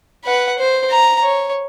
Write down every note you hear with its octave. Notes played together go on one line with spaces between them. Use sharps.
B4 F#5
C5
A#5
C#5